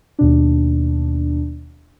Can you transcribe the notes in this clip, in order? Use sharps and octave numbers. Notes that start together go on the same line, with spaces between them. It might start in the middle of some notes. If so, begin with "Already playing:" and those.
D#2 B2 D4